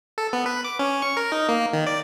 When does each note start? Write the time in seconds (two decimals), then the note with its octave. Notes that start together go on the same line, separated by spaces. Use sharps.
0.18 A4
0.33 B3
0.46 B4
0.65 D6
0.79 C#4
1.02 C#6
1.17 A#4
1.32 D#4
1.49 A#3
1.73 D#3
1.87 D5